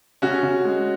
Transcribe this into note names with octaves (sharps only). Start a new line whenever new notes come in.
C#3 C#4 F#4
C#3
G#3